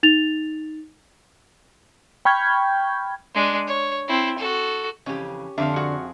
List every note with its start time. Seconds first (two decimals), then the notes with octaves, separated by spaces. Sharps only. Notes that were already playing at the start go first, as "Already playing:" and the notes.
0.03 D#4 A6 F7
2.25 G5 B5 C#6 F6 G6 G#6
3.35 G#3 D4
3.67 C#5
4.08 C4 E4
4.38 F#4 A4
5.06 F2 C#3 E3 C#4 G4
5.58 F2 D3 D4 C5 E5 F5
5.76 F#4 G#4 F#5